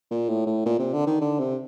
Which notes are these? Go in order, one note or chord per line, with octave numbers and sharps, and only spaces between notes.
A#2
A2
A2
A#2
C3
D3
D#3
D3
C3